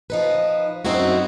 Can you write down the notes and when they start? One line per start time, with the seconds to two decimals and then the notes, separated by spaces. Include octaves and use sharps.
0.10 F3 D#4 B4
0.85 F#2 A2 C4 D#4 E4 F#4